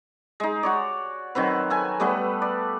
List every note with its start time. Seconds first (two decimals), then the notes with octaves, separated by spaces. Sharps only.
0.40 G#3 D#4
0.63 F#4 C#5 D5
1.35 D#3 F#3 C4 B4
1.70 A4 B4 G#5
2.00 G3 A3 B3 B4
2.42 D5